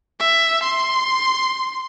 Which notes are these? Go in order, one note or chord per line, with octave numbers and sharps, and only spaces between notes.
E5
C6